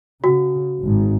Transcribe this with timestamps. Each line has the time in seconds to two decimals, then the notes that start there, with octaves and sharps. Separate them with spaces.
0.24 C#3 F#4
0.82 G#1 G#2